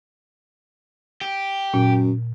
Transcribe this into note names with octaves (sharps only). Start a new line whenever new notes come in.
G4
F#2 A#2